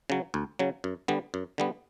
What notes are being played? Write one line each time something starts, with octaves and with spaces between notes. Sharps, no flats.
C#3 F#3
D2
C#3 F#3
F#2
D3 G3 B3
F#2
D3 G3 B3